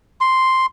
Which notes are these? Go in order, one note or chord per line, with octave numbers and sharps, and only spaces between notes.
C6